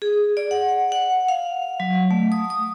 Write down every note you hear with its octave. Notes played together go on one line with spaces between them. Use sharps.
G#4
D5
F#5
F#5
F5
F#3
A3
D#6
D#6